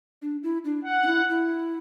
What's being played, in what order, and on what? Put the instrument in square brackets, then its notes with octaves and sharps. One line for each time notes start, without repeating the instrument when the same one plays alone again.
[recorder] D4
E4
D4
[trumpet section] F#5
[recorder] D4
E4
E4